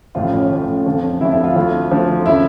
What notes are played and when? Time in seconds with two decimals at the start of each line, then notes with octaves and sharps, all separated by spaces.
0.15 A1 A2 F3 F4
0.33 C#4
0.50 A1 A2 F3
0.86 F1 F2 D3 F3
1.21 F1 F2 D3 F3 E4
1.32 E4
1.44 F4
1.56 D2 D3 F3
1.91 D2 D3 F3
2.26 C#3 F3 E4